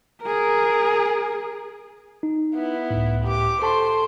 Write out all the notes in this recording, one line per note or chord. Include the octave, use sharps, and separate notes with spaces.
G#4 A#4
D#4
B3 E4
C#2 A2
G4 D6
A4 C5 A5 C6 C#6